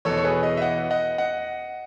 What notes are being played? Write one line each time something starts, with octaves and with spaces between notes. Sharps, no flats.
E2 B2 A4 C#5
C#5
G#4 B4
B4 D#5
E5
D#5 F#5
D#5 F#5
D#5 F#5